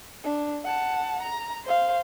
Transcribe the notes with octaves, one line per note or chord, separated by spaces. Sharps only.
D4
F#5 A5
A#5
C5 F5